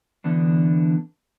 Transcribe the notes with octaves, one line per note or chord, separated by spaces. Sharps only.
D3 E3 B3 D4